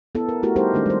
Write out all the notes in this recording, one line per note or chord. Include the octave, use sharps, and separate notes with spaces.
B3 E4 A4
A#4
A3 E4 F#4 G4 A#4
G3 B3 D#4 G4 A#4 C5
D#3 G#3 A3 C4 D4
G3 C5